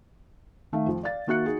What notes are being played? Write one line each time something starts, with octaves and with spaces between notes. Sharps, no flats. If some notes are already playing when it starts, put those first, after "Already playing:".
D#3 A3 F5
F2 F3
D5 F5 A6
D#3 A#3 F#4 E5 F#6 C#7
D#4 F#4 G#4